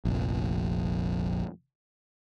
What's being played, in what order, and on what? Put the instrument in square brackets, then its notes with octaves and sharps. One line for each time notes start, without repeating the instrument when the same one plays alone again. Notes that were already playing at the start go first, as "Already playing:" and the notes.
[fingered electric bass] F1 A#1